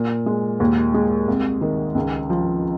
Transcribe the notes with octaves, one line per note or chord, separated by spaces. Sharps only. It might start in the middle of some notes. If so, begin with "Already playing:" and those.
Already playing: A#2
G#3
D#2
G#3
C2
D#3
C#2
F3